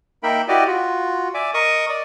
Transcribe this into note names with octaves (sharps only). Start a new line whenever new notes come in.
A#3 D#4 A#4 E5 G5 B5
E4 F#4 G4 D5 D#5
F4 F#4
D5 E5 G#5 D6
A#4 D#5 C#6 D#6
D5 D#5